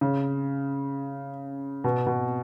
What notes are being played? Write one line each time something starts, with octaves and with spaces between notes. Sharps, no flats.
C#3
B2
B2